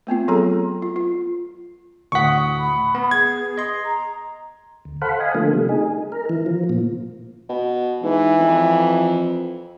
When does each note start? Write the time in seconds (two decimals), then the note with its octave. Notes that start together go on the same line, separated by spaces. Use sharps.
0.07 A3 B3 C4 F4
0.28 F#3 G#4 A4 A#5
0.82 F4
0.96 F4
2.12 D2 A2 F#5 C#6 D#6 B6
2.59 B5
2.95 B3
3.11 G#4 G#6
3.58 D#5 C6
3.85 A#5
4.85 D2
5.02 A4 C5 F5 F#5 B5
5.20 D#5 F5 G#5
5.34 D3 F3 A3 A#3
5.54 C3 G3 A3
5.69 D#4 G#4
6.12 A#4
6.29 E3
6.46 F3
6.69 A#2
7.49 B2
8.03 G#2 E3
8.40 F2